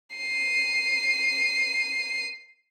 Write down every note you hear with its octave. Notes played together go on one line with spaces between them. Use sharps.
C7 D#7